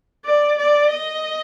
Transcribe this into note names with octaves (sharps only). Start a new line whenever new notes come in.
D5
D5
D#5